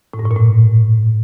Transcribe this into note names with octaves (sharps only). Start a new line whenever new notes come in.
A2
G2
A2
A#2
A2